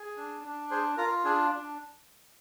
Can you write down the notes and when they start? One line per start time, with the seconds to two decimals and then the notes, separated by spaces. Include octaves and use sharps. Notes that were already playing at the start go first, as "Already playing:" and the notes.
Already playing: G#4
0.17 D4
0.44 D4
0.71 G#4 C5
0.97 F4 A#4
1.25 D4 G#4
1.51 D4